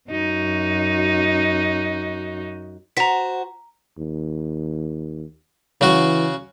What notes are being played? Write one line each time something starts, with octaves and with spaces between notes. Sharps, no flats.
F#2 D#4 F#4
F#4 C5 A#5 B6
D#2
C#3 E3 F#4